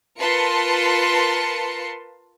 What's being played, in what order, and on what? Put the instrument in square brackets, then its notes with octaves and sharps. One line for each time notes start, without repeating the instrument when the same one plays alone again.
[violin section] F4 A#4 B4 A5 C6 C#7